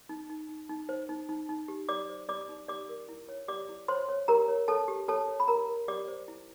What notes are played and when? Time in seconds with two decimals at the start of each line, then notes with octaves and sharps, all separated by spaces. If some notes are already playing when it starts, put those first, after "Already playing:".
0.09 D#4
0.30 D#4
0.49 D#4
0.69 D#4
0.89 C5
1.09 D#4
1.29 D#4
1.49 D#4
1.68 G4
1.89 G4 D5 D6
2.09 C5
2.29 G4 D5 D6
2.49 D#4
2.68 G4 D5 D6
2.89 A#4
3.09 E4
3.29 C#5
3.48 G4 D5 D6
3.69 E4
3.88 C5 C#5 C6
4.09 C#5
4.28 G4 A#4 A#5
4.48 C#5
4.68 A4 C#5 A5
4.88 G4
5.08 A4 C#5 A5
5.28 C#5
5.40 B5
5.48 G4 A#4 A#5
5.68 A#4
5.88 G4 D5 D6
6.08 C5
6.28 E4